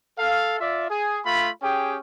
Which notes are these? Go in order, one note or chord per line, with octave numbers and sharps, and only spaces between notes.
A4 F5
F4 D5 E5
G#4 G#5
A3 F4 B5
C#4 G4 G#4 G5